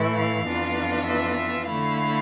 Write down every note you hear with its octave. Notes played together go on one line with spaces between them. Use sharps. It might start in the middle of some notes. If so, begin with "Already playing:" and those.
Already playing: A2 E3 A3 E4
F5
F2 E3 B3 D4 F4
E5
E5
D3 A3 E4 F5